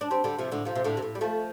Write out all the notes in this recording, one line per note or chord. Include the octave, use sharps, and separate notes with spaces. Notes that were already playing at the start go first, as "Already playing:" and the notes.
D4
G3 C4
D3 G3
C3 F3
A2 D3
C3 F3
C3
A2 D3
C3
A2
G3
F3 A3